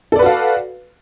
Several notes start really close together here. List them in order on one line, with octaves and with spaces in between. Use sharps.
A4 D5 B4 F#4 F5